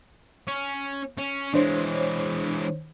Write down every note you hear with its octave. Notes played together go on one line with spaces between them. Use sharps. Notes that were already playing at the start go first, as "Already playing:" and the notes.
C#4
C#4
E3 G#3 D4 C5 C#5